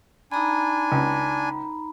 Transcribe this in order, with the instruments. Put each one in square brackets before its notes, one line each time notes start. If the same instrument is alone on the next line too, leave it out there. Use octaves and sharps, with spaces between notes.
[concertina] D4 G#5 [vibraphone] D#4 A#5 B5
[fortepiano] C#2